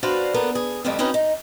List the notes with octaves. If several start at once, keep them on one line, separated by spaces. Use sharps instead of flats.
D4 F#4 B4 C5 D5 F5
A#3 B3 D4 A4 A#4
G#4
F2 G#2 C3 D#3 G3 A3
C4 C#4 D#4 F#4 B4 D#5
D#4